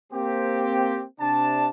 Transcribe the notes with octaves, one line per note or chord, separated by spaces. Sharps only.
A#3 C4 G4
C3 D4 A5